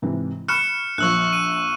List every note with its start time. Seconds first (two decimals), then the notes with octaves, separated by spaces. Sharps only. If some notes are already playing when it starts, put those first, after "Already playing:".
0.02 G#2 C3 E3
0.48 B5 C#6 F6 F#6 C#7 E7
0.98 A#1 F3 C#6 E6 F#6
1.33 D#7